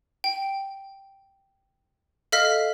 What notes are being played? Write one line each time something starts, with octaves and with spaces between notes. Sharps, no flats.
G5
A4 D#5 F5 F6 B6